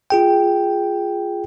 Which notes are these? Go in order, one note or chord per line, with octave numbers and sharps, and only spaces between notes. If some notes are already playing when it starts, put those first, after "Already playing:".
F4 G#4 G5